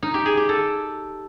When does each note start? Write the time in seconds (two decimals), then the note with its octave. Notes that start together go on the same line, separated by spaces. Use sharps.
0.03 D#4
0.14 G4
0.26 G#4
0.37 G4
0.49 A4